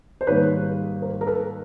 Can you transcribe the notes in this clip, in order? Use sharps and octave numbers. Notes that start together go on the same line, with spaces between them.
C5
G#2 D#3 G3 A#3 B4 C#5
A#4 C5
A#4
A4 B4